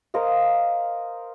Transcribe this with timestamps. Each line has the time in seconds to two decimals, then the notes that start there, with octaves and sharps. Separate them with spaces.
0.14 A#4 C5 D#5 F5